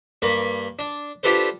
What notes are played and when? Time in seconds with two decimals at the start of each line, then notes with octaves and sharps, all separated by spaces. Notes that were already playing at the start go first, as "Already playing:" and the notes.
0.22 G2 A#3 B4
0.79 D4
1.23 D4 F4 G4 A4 B4 C5